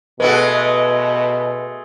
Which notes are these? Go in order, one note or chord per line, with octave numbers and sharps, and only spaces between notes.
B2 G#3 A3 F#4 B4